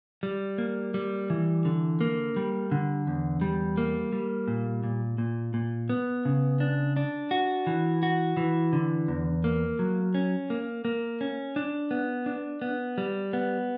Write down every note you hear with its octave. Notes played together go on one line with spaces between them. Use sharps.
G3
A#3
G3
E3
D3
A#3
G3
D3
E2
G3
A#3
G3
A#2
A#2
A#2
A#2
B3
C#3
D4
D4
F#4
E3
F#4
E3
D3
E2
A#3
F#3
C#4
A#3
A#3
C#4
D4
B3
D4
B3
G3
B3